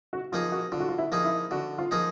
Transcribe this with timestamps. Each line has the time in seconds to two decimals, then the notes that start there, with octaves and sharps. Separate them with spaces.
0.13 F#4
0.32 F3 A#3 D#4 F4 G#4
0.52 F#4
0.72 D3 F4
0.80 F#4
0.89 F4
0.98 E4
1.12 F3 A#3 D#4 G#4
1.25 E4
1.51 D3 F#4
1.78 F4
1.91 F3 A#3 D#4 G#4